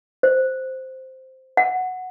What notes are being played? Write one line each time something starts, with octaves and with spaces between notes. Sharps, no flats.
C5
F#5